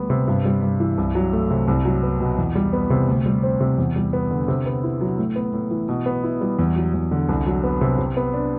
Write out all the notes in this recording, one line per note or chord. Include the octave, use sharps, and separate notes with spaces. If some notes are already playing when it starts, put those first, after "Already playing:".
Already playing: D2 G3 B3
C3
G2
G3
G2
E3
C2
F#3
A3
C3
C2
F#3
B3
B2
E2
G3
B3
C3
D2
G3
C4
C3
E2
G3
B3
D3
C3
B3
E4
F#3
A2
B3
A2
E3
B2
B3
E4
G3
E2
F#3
E2
D3
C2
F#3
B3
C3
C3
B3
D4